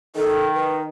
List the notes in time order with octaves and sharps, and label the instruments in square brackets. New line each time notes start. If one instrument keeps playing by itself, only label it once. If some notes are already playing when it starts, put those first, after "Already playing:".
[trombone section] D#3 [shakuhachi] A4
[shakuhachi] B4